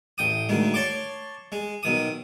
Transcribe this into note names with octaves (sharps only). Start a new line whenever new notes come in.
A1 G5 D#6
D2 D#3 G#3
C#5 A5 C6 D6
G#3
B1 D#3 D#6